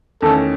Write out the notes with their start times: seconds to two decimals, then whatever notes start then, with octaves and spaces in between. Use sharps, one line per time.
0.22 E2 D#3 A3 C#4 A4